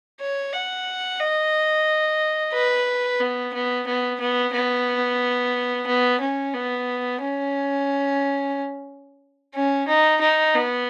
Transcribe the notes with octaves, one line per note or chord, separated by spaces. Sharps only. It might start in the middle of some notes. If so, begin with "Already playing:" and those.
C#5
F#5
D#5
B4
B3
B3
B3
B3
B3
B3
C#4
B3
C#4
C#4
D#4
D#4
B3